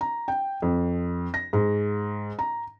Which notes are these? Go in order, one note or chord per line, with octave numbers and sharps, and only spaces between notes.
A#5
G5
F2
A#6
G#2
A#5